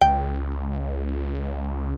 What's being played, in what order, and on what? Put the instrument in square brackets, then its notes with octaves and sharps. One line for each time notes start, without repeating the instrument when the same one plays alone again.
[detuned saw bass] C#2 [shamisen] G5